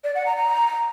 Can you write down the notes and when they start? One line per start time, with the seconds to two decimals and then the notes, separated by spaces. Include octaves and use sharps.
0.04 D5
0.15 F#5
0.26 A#5
0.37 A#5